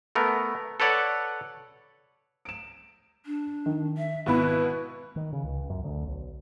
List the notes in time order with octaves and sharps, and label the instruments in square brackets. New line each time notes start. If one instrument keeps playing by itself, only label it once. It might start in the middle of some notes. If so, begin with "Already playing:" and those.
[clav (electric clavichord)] A3 B3 A#4
A4 B4 C#5 D5 F#5
[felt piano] D7 E7
[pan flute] D4
[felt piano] D#3
[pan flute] E5
[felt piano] G#1 B5 [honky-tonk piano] B2 B3 E4 [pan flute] B4
[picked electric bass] D#3
C#3
C#2
F#2
D2
B1